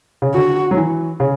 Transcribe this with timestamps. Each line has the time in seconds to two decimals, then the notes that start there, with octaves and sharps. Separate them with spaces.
0.22 C#3
0.34 D3 F#4
0.71 F#3
0.77 E3
1.20 C#3